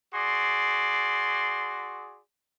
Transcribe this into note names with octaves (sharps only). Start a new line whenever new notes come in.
F#4 G#4 D5 C6